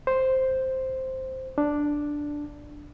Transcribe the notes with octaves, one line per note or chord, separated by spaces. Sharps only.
C5
D4